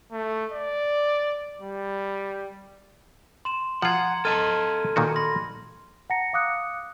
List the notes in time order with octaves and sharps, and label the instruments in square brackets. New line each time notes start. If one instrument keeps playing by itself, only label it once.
[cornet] A3
D5
G3
[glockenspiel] C6 E7
[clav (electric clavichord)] F3 F4 [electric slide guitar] F#5 [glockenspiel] A#5 C6 G#6
[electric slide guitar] A4 D#5 A5 [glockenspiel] F6 G#6 D#7
[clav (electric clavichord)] A#2 D#3 F#4
[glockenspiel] B5 C6 A#6
[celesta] F#5 A5 A#5 A#6 C#7
F5 D6 D#6 F#6 C#7